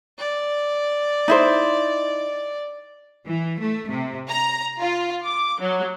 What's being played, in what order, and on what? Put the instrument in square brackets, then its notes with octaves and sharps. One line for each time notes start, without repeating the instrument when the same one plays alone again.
[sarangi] D5
[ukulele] D#4 E4 C5
[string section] E3
A3
C3
A#5
F4
D6
F#3